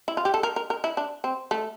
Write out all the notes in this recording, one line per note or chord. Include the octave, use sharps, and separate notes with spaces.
E4
F4
G4
A4
A#4
A#4
A#4
E4
D4
C4
A3